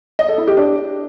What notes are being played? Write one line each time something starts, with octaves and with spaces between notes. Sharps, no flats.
D#5
A4
E4
G4
D4